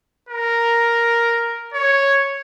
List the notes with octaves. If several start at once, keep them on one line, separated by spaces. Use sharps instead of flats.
A#4
C#5